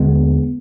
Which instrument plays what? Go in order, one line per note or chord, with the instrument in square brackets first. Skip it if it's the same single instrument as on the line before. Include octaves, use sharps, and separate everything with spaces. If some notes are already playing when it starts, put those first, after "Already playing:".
Already playing: [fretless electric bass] D#2 D3 G#3 B3